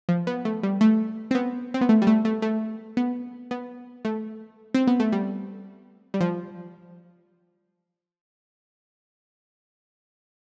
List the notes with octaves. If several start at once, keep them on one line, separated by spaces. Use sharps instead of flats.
F3
B3
A3
G3
A3
C4
B3
C4
B3
A3
G3
A3
A3
A3
B3
B3
A3
C4
B3
A3
G3
G3
F3